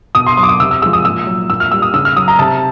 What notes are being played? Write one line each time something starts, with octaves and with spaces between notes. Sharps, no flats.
B2 D#6
C6
F#3 C6
D6
D#6
C3 E6
E6
F3 G#3 E6
D#6
A#2 E6
F#3
A#2 E6
F6
G3 E6
D#6
C#3 E6
F6
F#3 D#6
A#5
C3 A5